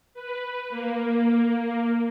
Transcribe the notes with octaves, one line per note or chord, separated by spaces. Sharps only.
B4
A#3